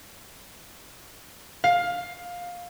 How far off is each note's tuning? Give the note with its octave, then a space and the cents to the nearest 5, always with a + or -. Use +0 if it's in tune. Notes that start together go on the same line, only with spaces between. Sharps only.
F5 +15